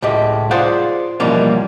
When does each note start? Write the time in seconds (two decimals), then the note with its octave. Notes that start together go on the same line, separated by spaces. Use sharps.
0.02 C#2 A2 G4 D#5
0.51 F4 G#4 C5 D5 F5 F#5
1.20 B2 E3 F3 G3 A#3 C#4